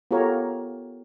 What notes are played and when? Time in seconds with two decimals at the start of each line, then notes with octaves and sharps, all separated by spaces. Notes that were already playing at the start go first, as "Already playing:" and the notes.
0.11 B3 F4 G4 A4 A#4 C#5